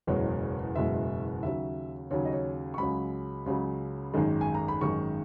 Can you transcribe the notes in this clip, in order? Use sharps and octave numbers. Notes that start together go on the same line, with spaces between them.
F#1 E2 B2 G#3 C#5
F#1 E2 B2 G#3 E5
D#2 C#3 F#3 E5
D#2 C#3 F#3 C#5
D#5
C#5
C#6
C#2 C#3 F#3 B5
C#2 C#3 F#3
G#1 F#2 D#3 G#3
G#5
A#5
B5
G#1 F#2 D#3 G#3 C#6